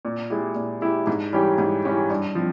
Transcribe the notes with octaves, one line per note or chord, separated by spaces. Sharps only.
A#2
G#3 E4 G4
A#2
G#3 E4 G4
G#2
E3 G3 C#4 G4
G#2
E3 G3 C#4 G4
G2
F3 C4